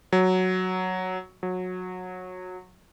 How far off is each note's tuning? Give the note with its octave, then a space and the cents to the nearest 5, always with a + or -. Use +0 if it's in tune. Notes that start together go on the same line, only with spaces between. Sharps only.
F#3 +0
F#3 -20